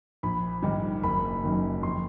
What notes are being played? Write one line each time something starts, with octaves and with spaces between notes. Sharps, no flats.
A#1 B5
G#2 D#3 G3
F#1 B5
F#2 D#3
F2 C6